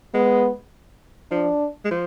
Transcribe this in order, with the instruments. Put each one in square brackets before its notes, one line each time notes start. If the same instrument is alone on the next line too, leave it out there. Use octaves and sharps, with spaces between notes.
[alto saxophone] G#3 [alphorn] B3
[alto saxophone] F3 [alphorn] D4
[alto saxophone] G#3
F3